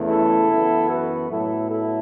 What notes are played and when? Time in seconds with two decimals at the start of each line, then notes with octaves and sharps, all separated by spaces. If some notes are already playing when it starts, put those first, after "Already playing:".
Already playing: E2 C#3 A3
0.09 E4 A4
0.49 F#2 E3 B3
0.90 F#4 B4
1.29 A2 F#3 B3 E4 A4
1.70 E4 A4